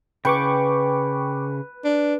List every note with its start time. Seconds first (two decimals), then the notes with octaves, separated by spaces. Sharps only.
0.25 C#3 B4 G5 C#6 D6
1.84 D4